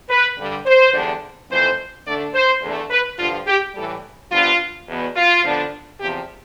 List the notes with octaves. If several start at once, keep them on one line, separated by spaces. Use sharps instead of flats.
B4
G2 D3 G3
C5
E2 D3 G3 D4
F2 E3 A3 C5
D3 A3 D4 D5
C5
E2 D3 A3
B4
G2 D3 F3 F4
G4
A2 E3 G3 A4
G2 F3 B3 D4 F4
E2 B2 B3
F4
D3 F3 B3 D4
E2 C3 F3 G4